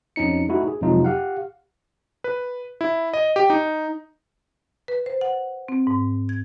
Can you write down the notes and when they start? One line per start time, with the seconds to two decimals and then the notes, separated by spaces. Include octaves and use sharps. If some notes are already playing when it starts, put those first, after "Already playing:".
0.16 F2 C#4 D#4 C#7
0.49 A3 D#4 E4 F#4
0.68 G#4
0.81 F2 C3 F#3 G#3 D#4 F4
1.04 G4 F5 F#5
2.24 B4
2.81 E4
3.13 D#5
3.36 G4
3.50 D#4
4.88 B4
5.06 C5
5.21 F#5
5.68 C4
5.87 G#2
6.29 G#6